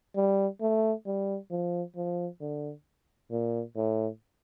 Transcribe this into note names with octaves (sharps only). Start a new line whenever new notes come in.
G3
A3
G3
F3
F3
D3
A#2
A2